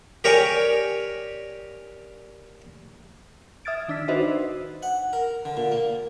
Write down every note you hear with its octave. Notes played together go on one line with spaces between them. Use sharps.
G4 A#4 C#5 D5 G#5
E5 D#6 F6 G#6 A6 D7
D#3 D4 E6 B6
D#4 F#4 B4 C5 D#5 E5
F#5
A#4
D3
A#2
A#3